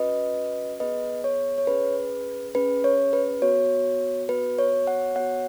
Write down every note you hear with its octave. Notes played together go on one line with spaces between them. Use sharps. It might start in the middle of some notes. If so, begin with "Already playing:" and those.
Already playing: C#4 F#4 B4 D#5
B3 G#4 B4 D#5
C#5
C#5
C#4 G#4 B4
C#4 G#4 B4
C#5
B4
B3 F#4 C#5
B3 F#4 B4
C#5
C#5 F#5
B3 F#4 C#5 F#5